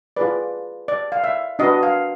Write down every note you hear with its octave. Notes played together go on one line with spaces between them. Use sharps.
F4 G#4 B4 D5
D5
F5
E5
D4 F#4 B4 D#5
F5